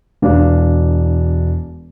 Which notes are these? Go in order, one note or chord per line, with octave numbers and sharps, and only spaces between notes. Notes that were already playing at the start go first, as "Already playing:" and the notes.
E1 D4 F5